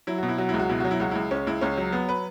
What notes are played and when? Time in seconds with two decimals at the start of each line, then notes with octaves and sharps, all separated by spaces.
0.07 F#3 E4
0.18 B2 F#4
0.28 E4
0.38 F#3 F#4
0.49 C#2 E4
0.60 F#4
0.69 B2 E4
0.80 F#3 F#4
0.91 E4
1.00 C#2 F#4
1.11 C#2 E4
1.31 C#2 C#4
1.47 C#2 E4
1.61 C#2 C#4
1.78 F#3
1.92 F#3 B3
2.09 B4